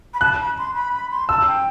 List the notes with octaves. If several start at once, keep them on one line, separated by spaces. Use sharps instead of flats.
B5
A5 F#6
B5
C6
B5
B5
C6
A5 E6
G5